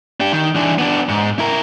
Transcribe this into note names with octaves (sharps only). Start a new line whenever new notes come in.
D4 G4
D#3
E3 D4
B3 D4
G#2
E4 A#4